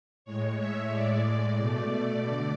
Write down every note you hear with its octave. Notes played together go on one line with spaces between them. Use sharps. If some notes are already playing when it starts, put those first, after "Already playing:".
A2 G#3 C#5
E5
A2 G#3 D5
D5
B2 A3 D5
D3